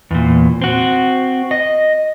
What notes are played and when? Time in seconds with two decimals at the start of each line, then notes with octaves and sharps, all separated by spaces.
0.11 E2 A#2
0.62 C4 F#4
1.51 D#5